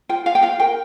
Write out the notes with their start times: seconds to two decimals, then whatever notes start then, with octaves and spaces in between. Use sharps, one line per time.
0.09 F4 G5
0.26 F4 F5
0.35 G5
0.43 F4 F5
0.60 A#4 G5